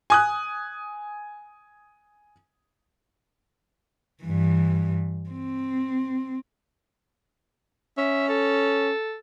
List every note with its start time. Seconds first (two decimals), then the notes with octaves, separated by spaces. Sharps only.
0.10 G#5 D#6 F#6
4.23 G2 E3
5.30 C4
7.98 C#4 E5
8.29 A4